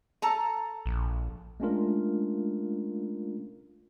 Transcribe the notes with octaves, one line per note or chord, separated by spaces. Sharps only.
A4 A5 A#5
A#1
G#3 A3 C#4 D4 F4 A#4